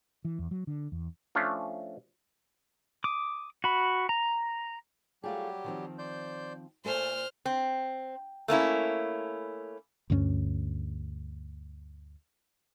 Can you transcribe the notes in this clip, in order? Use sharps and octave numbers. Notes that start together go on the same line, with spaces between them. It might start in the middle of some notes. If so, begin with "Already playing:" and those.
E3
E2
F#3
D3
E2
F3 A3 C#4 D4 F4
D6 D#6
F#4 B5
A#5
F#3 G3 A3 F4 G4 G#4
D#3 F3 C4
C5 D5 G6
A#2 A3 A4 C5 G#5 F6
C4
A3 A#3 C#4 E4
D2 G2 A3 C#4